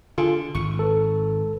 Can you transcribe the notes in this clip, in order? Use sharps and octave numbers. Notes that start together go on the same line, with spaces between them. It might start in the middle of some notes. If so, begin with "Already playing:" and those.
D3 F4 G#4 A4
G#1 C#6
A4 B4